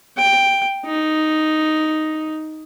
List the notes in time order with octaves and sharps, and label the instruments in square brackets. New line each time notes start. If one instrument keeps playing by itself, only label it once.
[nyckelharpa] G5
D#4